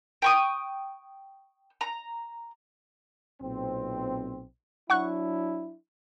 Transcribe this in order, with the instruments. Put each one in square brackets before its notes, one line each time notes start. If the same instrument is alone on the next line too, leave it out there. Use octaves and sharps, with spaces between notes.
[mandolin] G5 C#6 D#6
A#5
[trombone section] B1 A#2 C4
[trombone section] F#3 D4 E4 [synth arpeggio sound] F#5 C#6 F#6